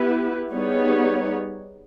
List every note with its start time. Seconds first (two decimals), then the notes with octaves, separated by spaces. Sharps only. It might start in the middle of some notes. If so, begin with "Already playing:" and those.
Already playing: B3 E4 G4 B4
0.53 G3 B3 D#4 G#4 C#5